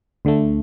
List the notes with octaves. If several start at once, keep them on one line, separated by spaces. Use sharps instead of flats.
D2 D3 A3